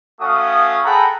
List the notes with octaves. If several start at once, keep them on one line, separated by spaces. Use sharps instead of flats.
A3 C#4 F#4 F5 D#6
G#4 A4 F#5 G5 A#5 B5